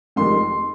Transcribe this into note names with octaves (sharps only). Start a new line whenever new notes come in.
F1 F2 D#3 G#3 C6